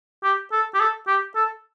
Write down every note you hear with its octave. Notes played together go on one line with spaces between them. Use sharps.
G4
A4
G4
A4
G4
A4